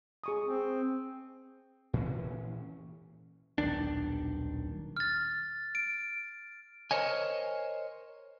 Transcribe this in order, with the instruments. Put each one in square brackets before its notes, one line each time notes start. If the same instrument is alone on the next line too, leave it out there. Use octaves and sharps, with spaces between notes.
[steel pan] G#4 C#6 D#6
[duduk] C4
[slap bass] A#2 E3 C#4
[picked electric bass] D#1 B1 D#3 D4
[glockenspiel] F6 A6
D7
[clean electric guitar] A#4 C5 C#5 D#5 G#5